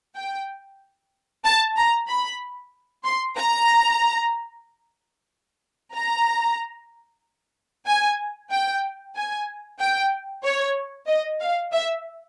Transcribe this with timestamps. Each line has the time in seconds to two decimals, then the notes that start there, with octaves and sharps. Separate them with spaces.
0.15 G5
1.45 A5
1.77 A#5
2.08 B5
3.04 C6
3.38 A#5
5.94 A#5
7.86 G#5
8.51 G5
9.15 G#5
9.80 G5
10.44 C#5
11.07 D#5
11.41 F5
11.73 E5